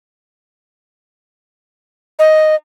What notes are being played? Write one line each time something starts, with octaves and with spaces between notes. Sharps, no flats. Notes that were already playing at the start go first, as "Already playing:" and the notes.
D#5